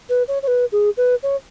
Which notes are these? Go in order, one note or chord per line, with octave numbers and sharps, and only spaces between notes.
B4
C#5
C#5
B4
G#4
B4
C#5